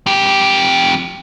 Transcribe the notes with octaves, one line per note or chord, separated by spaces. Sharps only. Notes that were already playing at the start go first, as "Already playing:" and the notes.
F2 G4